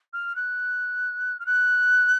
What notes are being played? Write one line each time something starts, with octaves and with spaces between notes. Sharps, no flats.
F6
F#6
F6
F#6